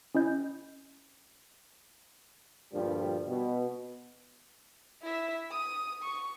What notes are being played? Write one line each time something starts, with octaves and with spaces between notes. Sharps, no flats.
C#4 E4 D#5 G6
D2 G2 A#2 F3 G3
B2
E4 E5
D#6
C#6